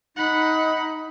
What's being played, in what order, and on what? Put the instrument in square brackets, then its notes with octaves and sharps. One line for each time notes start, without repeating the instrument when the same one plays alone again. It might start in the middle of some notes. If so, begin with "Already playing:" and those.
[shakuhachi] D#4 [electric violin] F#5 B5